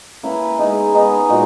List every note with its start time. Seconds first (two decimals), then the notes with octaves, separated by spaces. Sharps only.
0.23 A#3 C#4 E4 B4
0.59 G#3 B3 D#4 G#4
0.93 G#3 B3 D#4 G#4
1.29 A#2 G#3 D#4 F#4